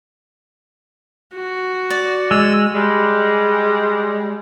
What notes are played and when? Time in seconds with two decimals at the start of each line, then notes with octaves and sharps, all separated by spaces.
1.36 F#4
1.90 D5
2.31 G#3 E6
2.75 G3 G#3